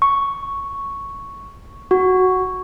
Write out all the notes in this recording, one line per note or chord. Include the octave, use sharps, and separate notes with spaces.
C#6
F#4